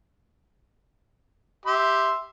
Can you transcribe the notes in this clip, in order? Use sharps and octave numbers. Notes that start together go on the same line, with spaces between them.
G4 E5 C6